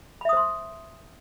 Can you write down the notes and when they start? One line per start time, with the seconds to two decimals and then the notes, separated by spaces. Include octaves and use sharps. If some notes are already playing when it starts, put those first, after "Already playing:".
0.21 B5
0.25 E5
0.29 D#6
0.33 C5
0.37 C6